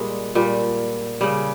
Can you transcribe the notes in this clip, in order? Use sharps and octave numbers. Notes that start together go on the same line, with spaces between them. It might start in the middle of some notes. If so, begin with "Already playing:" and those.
Already playing: A#2 G3 G#3
A#2 G3
C#3 G3